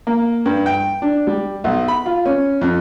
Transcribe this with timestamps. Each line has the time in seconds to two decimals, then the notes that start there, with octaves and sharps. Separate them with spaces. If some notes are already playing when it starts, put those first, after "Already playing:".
0.07 A#3
0.46 G2
0.66 G5
1.02 D4
1.27 G3
1.64 B1
1.88 B5
2.06 F4
2.26 C#4
2.61 F2